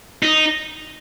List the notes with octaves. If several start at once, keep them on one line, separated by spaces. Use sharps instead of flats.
D#4